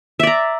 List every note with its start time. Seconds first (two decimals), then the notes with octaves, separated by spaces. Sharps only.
0.20 E5
0.23 D5
0.27 A#5